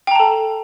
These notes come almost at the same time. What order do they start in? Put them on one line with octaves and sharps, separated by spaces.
G5 A#5 A5 A4